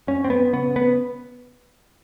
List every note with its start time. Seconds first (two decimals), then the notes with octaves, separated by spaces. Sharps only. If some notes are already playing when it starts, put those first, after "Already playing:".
0.07 F#2 C#4
0.24 C4
0.30 B3
0.53 C#3 B3
0.76 B3